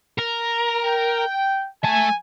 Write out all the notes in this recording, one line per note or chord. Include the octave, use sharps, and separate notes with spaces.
A#4
G5
A3 G#5 A5